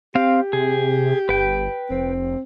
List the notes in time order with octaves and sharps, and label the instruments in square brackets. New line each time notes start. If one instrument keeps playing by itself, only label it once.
[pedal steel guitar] C4 F5 [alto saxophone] G4
[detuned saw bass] C3 [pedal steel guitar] G#4
[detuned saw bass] G1 [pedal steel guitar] B4 G5
[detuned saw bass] F1 [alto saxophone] C4